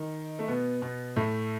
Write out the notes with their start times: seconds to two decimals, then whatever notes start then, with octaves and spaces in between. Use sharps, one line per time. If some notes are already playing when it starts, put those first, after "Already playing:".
Already playing: D#3 D#4
0.39 A3
0.48 B2 B3
0.82 B2 B3
1.16 A2 A3